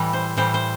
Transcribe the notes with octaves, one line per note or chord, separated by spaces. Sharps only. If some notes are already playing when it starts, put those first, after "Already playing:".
Already playing: A2 E3 G3
C5
A2 E3 G3 C5
C5